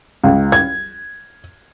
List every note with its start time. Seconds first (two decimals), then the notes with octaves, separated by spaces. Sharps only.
0.24 C#2
0.52 G#6